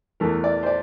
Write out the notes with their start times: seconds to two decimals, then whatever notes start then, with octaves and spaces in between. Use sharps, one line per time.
0.20 E2 E3 A3 A#4
0.44 D5
0.63 C5
0.66 D5